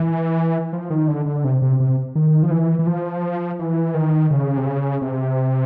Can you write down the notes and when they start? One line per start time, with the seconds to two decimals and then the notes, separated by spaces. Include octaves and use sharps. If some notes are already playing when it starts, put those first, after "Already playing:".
Already playing: E3
0.73 F3
0.90 D#3
1.08 D3
1.26 D3
1.44 C3
1.62 C3
1.80 C3
2.15 D#3
2.43 F3
2.51 E3
2.79 E3
2.87 F3
3.59 E3
3.94 D#3
4.31 C#3
4.57 C3
4.66 C#3
5.02 C3